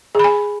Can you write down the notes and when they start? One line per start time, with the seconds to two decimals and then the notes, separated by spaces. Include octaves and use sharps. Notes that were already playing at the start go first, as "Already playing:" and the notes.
0.15 G#4
0.19 B5
0.24 G#5